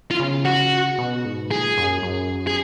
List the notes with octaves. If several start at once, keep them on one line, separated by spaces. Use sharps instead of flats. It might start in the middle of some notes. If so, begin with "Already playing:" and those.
F4
C#3
F#4
B2
G#2
A#2 G#4
F#2
F#2
G#4